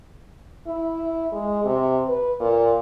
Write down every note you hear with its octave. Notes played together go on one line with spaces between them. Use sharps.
E4
G#3
C3
B4
A#2